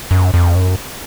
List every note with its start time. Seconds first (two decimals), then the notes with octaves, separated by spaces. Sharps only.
0.11 F#2
0.34 F2
0.55 F#2